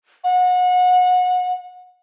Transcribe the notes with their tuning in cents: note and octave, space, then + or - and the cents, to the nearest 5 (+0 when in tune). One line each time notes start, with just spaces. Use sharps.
F#5 -30